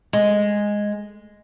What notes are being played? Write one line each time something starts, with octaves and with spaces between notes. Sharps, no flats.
G#3